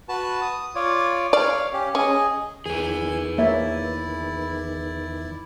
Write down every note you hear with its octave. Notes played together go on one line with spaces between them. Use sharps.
F#4 B4 A5
D#6
F4 C#5 D5
C#5 D5 F5
C#4 G4
C#4 G#4 D#5
E2 D#3 E3 G#4 B4 G#5
A#3 E4 C#5 D5 E5